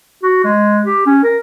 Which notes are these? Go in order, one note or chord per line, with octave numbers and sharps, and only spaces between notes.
F#4
G#3
G4
C#4
A#4